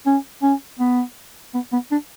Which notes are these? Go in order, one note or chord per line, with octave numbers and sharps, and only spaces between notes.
C#4
C#4
B3
B3
B3
D4